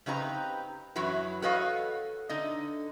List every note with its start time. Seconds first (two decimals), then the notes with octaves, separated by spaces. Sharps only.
0.06 C#3 C4 D#4 G4 B4 A#5
0.96 F#2 E3 F#3 F#4 B4
1.42 F#4 A4 B4 C#5 D#5 F5
2.29 D3 D#4 D#5